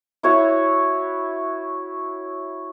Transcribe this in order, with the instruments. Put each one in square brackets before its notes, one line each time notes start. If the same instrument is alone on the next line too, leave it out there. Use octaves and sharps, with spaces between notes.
[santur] E4 F#4 C#5 F#5